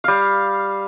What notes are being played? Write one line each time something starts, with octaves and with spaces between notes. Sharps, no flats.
G3 F5